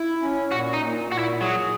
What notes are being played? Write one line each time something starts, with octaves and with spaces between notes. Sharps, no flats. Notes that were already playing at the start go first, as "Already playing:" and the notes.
Already playing: E4
C#4
A#2 F#4
D#4
A#2
A#2 F#4
E4
F#3 G#4